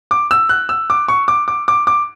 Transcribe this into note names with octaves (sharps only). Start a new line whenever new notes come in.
D6
E6
F#6
E6
D6
C#6
D6
D6
D6
D6